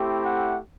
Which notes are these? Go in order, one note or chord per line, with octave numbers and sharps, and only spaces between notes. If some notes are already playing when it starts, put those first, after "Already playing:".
Already playing: A3 C4 E4 G4
F#5